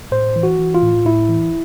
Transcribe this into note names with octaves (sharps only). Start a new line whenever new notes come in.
A2 C5
E3
F#4
E3
F4
A2
A2 E4
E3